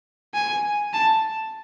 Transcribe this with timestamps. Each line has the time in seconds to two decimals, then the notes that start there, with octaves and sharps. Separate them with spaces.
0.34 G#5
0.93 A5